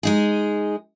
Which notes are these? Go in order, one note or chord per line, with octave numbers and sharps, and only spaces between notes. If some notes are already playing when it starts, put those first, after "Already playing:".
G#3 D#4 G#4